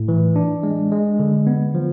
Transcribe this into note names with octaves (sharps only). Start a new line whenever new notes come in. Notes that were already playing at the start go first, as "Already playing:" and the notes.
Already playing: A2
E3
D4
G#3
G#3
D3
B3
F3